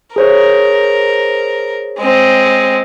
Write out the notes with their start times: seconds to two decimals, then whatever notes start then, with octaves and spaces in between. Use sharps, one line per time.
0.16 G#4 A#4 C5 C#5
1.99 G#3 C4